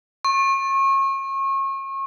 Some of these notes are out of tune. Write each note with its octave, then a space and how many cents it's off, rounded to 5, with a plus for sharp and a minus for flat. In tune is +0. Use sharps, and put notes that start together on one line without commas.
C#6 -35